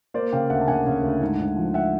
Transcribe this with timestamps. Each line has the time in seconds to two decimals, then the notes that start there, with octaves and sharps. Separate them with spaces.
0.14 A#3 C5 D5
0.32 C#3 F5 G5
0.50 D2 E5 F#5
0.61 A5
0.68 C#3 F#5 G#5
0.86 C#3
1.03 D2
1.21 G#2
1.40 G#2
1.56 F3
1.74 E5 F#5